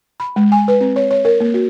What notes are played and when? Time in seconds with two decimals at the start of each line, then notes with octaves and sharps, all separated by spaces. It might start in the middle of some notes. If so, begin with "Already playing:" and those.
0.20 B5
0.36 G#3
0.52 G#5
0.68 B4
0.81 C4
0.96 C#5
1.11 C#5
1.25 A#4
1.40 A#3
1.54 F#4